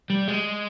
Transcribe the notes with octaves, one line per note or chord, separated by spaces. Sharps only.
G3
G#3